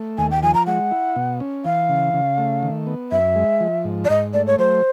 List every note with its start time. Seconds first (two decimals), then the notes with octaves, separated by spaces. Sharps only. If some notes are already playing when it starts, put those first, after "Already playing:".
Already playing: A3
0.18 D#2 G#5
0.31 G5
0.43 F3 G#5
0.54 A#5
0.66 G#3 F#5
0.91 E4
1.16 B2
1.40 C#4
1.65 E3 F5
1.89 C#3
2.14 C#3
2.38 A3
2.63 D#3
2.87 B3
3.11 F#2 E5
3.36 G#3
3.60 F3
3.85 G#2
4.05 D5
4.09 G#2 D#5
4.33 A3 D5
4.47 C#5
4.59 F#3 C5